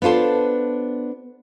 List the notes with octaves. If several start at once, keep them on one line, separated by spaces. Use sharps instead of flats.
B3 D4 F4 A4 C5